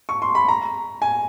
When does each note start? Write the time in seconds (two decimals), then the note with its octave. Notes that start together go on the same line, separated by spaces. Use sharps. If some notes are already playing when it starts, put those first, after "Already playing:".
0.09 C#6
0.22 C6
0.35 B5
0.48 A#5
1.02 G#5